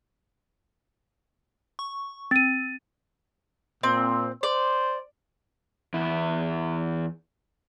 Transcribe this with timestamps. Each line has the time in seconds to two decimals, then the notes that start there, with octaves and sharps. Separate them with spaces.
1.79 C#6
2.31 C4 A6 D#7
3.83 A#2 C4
4.43 C5 D5
5.94 E2 E4